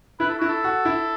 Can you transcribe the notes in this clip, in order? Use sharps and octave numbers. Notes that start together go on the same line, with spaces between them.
E4 B4
A4
E4 F#4
A4
F#4
E4